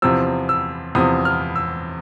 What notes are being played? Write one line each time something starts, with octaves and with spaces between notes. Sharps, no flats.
E2 C3 F3 E6
E6
E2 C3 F3 D#6
F6
E6